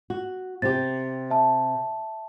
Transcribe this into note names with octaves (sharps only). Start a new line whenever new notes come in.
F#4
C3 G4 A6
E5 A5